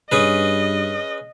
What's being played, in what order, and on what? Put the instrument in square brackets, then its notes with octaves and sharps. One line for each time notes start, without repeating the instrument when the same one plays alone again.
[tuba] G2 [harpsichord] C#4 G#4 B4 [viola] D#5